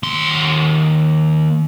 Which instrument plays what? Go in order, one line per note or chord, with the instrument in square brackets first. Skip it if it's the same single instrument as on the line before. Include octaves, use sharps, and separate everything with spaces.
[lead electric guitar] D#2 C6